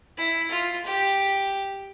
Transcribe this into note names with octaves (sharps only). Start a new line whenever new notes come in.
E4
F4
G4